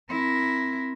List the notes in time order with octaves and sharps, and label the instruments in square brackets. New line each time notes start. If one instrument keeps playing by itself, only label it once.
[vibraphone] C4 [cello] E4 A#4